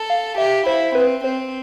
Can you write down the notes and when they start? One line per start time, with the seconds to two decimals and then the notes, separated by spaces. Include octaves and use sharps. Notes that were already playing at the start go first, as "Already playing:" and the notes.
Already playing: A4
0.10 F5
0.38 G4 E5
0.66 E4 C5
0.95 C4 B4
1.24 C4 C5